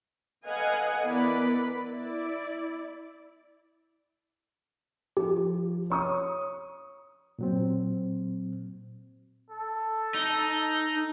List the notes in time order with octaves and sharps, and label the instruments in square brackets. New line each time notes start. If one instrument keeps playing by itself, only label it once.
[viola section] A4 B4 D#5 F5 F#5 G#5
E3 B3 A#4 B4 D5 B5
E4 D5
[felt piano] F3 [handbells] G4
[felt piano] C#5 C#6 D#6
[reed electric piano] A#2 F#3 C4
[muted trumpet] A4
[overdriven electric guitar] D#4